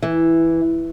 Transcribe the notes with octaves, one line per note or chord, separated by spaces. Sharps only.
E3